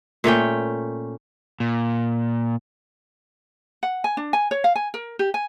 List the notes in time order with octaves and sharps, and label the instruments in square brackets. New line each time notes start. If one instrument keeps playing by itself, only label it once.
[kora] A#2 A3 C#4 G5
[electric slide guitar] A#2
[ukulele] F#5
G#5
D4
G#5
C#5
F5
G#5
A#4
G4
G#5